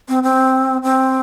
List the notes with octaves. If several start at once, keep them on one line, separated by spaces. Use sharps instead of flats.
C4
C4
C4